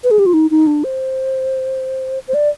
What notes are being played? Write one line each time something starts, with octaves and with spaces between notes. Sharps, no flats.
B4
G#4
G4
F4
D#4
D#4
D4
C5
C5
D5